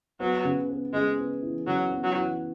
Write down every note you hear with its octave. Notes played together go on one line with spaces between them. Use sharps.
F#3 B3
C#3
B3
C#3 G#3
B3
E3
C#3 F#3
B3
F#3
E3